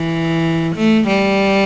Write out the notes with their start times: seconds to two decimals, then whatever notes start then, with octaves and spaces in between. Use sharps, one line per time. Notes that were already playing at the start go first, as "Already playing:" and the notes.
Already playing: E3
0.75 A3
1.08 G3